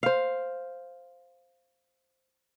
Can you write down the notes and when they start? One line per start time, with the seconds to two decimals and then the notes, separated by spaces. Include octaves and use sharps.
0.03 C5 F5